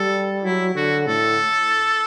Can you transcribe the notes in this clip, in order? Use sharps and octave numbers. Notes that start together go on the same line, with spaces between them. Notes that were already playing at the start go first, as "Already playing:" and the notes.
Already playing: G3 A4
F#3 E4
D3 F#4
A2 A4